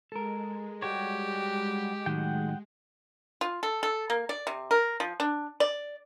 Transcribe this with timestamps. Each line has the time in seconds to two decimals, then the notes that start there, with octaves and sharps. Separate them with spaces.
0.12 G#3 A4 A#4
0.82 G3 F#4 G4 C#5
2.06 A2 D#3 F#3 F#5 G5
3.41 F4
3.63 A4
3.83 A4
4.10 A#3
4.29 D5
4.47 C3
4.71 A#4
5.00 F3
5.20 D4
5.60 D5